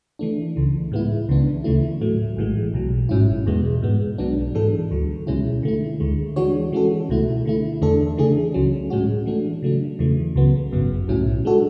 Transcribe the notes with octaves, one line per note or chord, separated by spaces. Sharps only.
E3 A3 D4
C#2 C#3 E3
A2 G#3 B3 E4
C#2 C#3 E3 B3 D4
D2 C#3 E3 A3 E4
A2 F#3 A3
A1 A2 E3 G#3
B1 B2 F#3
G#1 G#2 F#3 C#4 E4
E2 B2 G#3 B3
G#2 G#3 B3
B1 B2 F#3 B3 D4
G#2 E3 G#3 D4 A4
D2 D3 F#3
C#2 B2 G#3 C#4 E4
D3 A3 E4
D2 D3 G#3
E3 G#3 D4 F#4 C#5
E3 G#3 C#4 F#4 A4
C#2 B2 A3 E4
D3 A3 E4
E2 D3 A3 D4 A4
C#3 E3 A3 D4 G#4
C#2 C#3 F#3 C#4
A2 G#3 C#4 F#4
E3 A3 D4
C#3 F#3 A3 D4
E2 C#3 E3 A3
C#2 C#3 F#3 B3
G#1 F#2 C#3 F#3 B3
B1 A2 F#3 C#4 E4
G#3 D4 F#4 A4